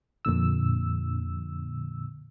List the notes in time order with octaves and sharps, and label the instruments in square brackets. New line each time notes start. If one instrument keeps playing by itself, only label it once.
[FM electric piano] F2 A#2 D3 E6